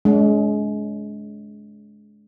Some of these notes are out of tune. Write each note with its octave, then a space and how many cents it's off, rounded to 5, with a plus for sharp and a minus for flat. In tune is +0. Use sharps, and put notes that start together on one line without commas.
G#3 +25 D4 -40